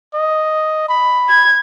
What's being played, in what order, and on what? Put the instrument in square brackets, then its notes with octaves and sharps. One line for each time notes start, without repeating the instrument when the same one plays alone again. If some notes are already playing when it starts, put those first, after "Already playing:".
[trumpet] D#5
B5
[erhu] G#6